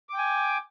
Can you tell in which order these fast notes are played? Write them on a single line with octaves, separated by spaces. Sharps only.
D6 G5 G#5